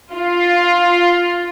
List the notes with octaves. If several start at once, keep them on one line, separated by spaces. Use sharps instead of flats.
F4